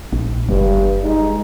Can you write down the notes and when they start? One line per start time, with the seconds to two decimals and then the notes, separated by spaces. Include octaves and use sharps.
0.13 A#1
0.49 F#1 G2
1.03 G#3 D#4